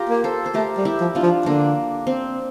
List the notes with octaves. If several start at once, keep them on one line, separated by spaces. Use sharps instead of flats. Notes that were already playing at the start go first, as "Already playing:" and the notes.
Already playing: F4 G4 A#4
A#3
A4 C5
C5
A3 G4 A#4
G3
E4 G4
F3
D4 F4
F3
D3 A#3 D4
C4